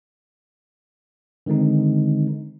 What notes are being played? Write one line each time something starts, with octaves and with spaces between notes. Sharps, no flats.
D3 D#3 G#3 C4 D#4